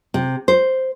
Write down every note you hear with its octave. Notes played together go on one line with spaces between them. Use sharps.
C3
C5